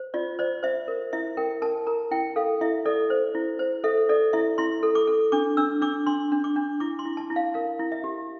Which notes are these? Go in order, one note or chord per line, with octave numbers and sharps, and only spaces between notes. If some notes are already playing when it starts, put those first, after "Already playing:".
Already playing: C5
F4 D5
C5 D5
C5 E5
A#4
E4 E5
A#4 G5
A#4 A5
A#4 A#5
E4 G5
A4 F5
E4 E5
A4 D5
C5
E4
C5
A4 E5
A4 D5
E4 E5
E4 C6
A4
D6
A4
D4 D6
D4 E6
D4 D6
D4 C6
D4
D6
D4
E4 D6
C6
E4
A5
E4
F5
A#4 F5
E4
E5
G4